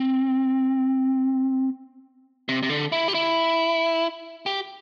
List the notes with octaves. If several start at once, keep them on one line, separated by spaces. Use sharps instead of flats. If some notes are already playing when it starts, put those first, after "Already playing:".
Already playing: C4
C3
C3
D3
E4
G4
E4
G4